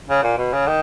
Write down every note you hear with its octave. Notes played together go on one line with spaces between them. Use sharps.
C#3
A#2
B2
C#3
D#3